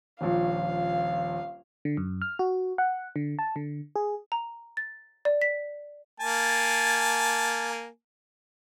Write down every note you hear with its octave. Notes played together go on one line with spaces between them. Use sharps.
D#1 A#1 F5
D3
F#2
F6
F#4
F#5
D3
A5
D3
G#4
A#5
A6
D5
B6
A#3 G#5 A5